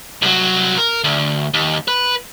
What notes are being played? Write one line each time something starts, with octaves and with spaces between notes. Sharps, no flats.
C2 F#3
A#4
D2
D#2
B4